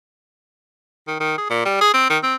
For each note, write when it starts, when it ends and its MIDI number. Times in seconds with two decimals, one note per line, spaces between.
1.07 1.19 51
1.20 1.38 51
1.38 1.50 68
1.50 1.63 46
1.65 1.77 55
1.81 1.91 68
1.94 2.07 60
2.10 2.18 51
2.23 2.35 60